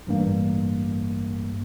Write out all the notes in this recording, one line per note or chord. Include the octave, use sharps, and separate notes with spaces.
A1 G2 A#3